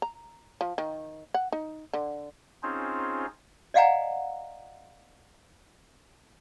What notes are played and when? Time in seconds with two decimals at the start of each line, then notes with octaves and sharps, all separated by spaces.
0.02 A#5
0.61 F3
0.78 D#3
1.34 F#5
1.52 D#4
1.93 D3
2.63 C4 C#4 D#4 F4 G#4 C5
3.74 D5 D#5 F5 F#5 G#5 A#5